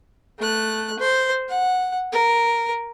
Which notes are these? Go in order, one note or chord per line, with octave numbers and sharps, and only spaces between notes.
A3 F#6
C5
F#5
A#4